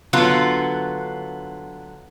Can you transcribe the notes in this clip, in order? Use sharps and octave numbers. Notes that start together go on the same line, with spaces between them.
D3 F#3 B3 F4